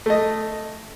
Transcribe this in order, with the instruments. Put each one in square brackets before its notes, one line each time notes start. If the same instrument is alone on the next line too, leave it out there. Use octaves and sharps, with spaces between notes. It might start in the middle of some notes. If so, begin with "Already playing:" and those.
[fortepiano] A3 D#5